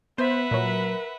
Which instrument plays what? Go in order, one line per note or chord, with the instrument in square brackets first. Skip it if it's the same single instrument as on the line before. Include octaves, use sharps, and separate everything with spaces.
[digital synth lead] B3 [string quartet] B4 E5 F#5 [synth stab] C5
[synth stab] A#2 F#3 [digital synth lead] A#4